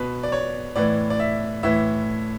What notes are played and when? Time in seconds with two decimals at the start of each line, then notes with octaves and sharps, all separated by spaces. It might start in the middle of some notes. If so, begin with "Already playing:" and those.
Already playing: B2 B4
0.23 D5
0.32 C#5
0.76 A2 E3 D5
1.10 D5
1.20 E5
1.63 A2 E3 E5